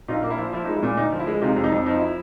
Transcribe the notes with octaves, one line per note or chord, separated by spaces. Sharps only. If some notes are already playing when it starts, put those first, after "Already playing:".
A#1 D#4 F4
A#3
E4
F3
F3 E4
G#3 D#4
E4
A#2
D2 D#4
F3
E4
G#3
C3 D#4 F4
F2
D#4
F2
F3 D#4
E4